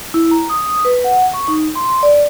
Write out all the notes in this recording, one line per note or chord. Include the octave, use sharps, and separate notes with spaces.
E4
A#5
D#6
B4
F#5
C#6
D#4
C6
D5